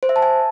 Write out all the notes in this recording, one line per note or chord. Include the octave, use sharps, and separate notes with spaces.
C5
E5
A5
G#5